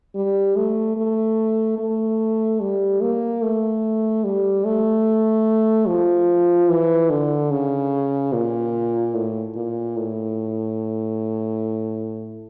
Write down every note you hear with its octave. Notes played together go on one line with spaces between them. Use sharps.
G3
A3
A3
A3
G3
A#3
A3
G3
A3
F3
E3
D3
C#3
A#2
A2
A#2
A2